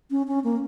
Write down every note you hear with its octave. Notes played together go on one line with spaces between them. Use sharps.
C#4
C#4
A#3